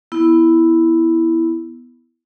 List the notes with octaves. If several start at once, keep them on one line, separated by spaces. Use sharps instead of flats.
B3 E4